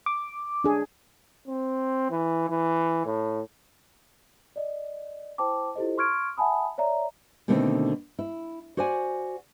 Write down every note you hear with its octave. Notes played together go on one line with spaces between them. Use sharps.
D6
D4 G#4
C4
E3
E3
A2
D5 D#5
E4 C5 G5 A5 D6
E4 F4 G4 A4 C5 D#5
C6 C#6 F6 G#6 D7
E5 F#5 G#5 A5 B5 D#6
C#5 D5 E5 A#5
B2 D3 D#3 A3 A#3 C4
E4
F#4 C5 D5 F#5 G#5